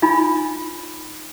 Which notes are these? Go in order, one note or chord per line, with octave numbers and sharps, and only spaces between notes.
D4 D#4 F4 G#5 B5